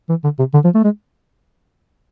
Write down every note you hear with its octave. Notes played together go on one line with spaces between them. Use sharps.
E3
D3
C3
D3
F3
A3
G#3